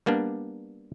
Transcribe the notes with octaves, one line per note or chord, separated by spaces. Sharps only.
G3 A#3 B3 D4